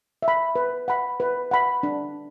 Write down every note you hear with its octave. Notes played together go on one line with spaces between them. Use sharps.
E5
B5
B4
F#5 B5
B4
F#5 B5
D4